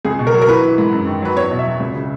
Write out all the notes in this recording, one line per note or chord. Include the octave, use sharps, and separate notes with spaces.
C#2 G#4
B2
A#4
F#3
A#4
E3 B4
E3
G#2
F#2
D#3
F#3 B4
E2 C#5
B2
E5
F#3
C#2
C#3